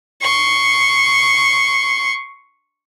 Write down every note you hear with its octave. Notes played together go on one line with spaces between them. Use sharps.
C6 C#6